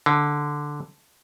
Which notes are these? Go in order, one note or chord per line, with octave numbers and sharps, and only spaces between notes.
D3